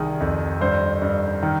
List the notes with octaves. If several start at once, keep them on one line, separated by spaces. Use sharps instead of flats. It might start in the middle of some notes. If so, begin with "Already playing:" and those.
Already playing: C2 D#3 G#4
F2
G2 C5
G2
D#3